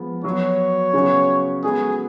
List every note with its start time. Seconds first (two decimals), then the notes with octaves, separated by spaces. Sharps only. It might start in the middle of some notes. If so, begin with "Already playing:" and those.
Already playing: F3 G#3 B3
0.24 F#3 B3 F#4 C#5
0.93 C#3 F#3 B3 F#4
1.64 G#3 B3 F#4 G#4 A4